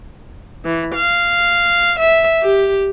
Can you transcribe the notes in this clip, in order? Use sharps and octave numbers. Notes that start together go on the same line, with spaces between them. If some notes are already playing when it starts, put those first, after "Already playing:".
E3
F5
E5
G4